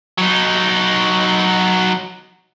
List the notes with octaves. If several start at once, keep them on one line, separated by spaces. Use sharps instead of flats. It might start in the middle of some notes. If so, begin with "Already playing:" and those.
F#3 D#4